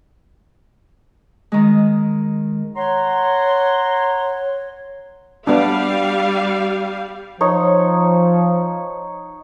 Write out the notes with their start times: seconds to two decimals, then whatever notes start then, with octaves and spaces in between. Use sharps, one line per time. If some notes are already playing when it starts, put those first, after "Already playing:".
1.52 D#3 G#3
2.76 C#5 F#5 A#5 C6
5.47 G3 B3 D4 F5
7.41 F3 D#4 C#5